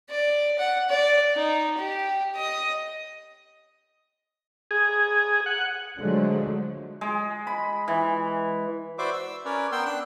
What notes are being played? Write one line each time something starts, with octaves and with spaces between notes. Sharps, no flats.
D5
F#5
D5
D#4
G4
D#5
G#4
F#5
D3 F3 F#3 G#3 A3
G#3
B5
E3
F#4 B4 C5 D5 E5 D6
E6
C#4 A#4 B4 C#5 D5
B3 A#4 G5 C6 E6
D4 E6 F#6